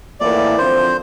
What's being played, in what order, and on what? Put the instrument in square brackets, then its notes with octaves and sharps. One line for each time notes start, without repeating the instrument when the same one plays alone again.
[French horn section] A2 E3 A#3 E4 A#4 [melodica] D5
[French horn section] D3 F3 C4 [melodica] C5